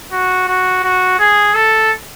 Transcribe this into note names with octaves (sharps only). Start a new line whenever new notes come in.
F#4
F#4
F#4
G#4
A4